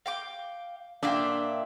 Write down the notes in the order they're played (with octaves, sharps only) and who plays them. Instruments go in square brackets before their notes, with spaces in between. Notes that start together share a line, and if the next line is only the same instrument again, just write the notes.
[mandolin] F5 G5 D6
[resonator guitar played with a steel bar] A#2 D4 [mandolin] E5 F5 G5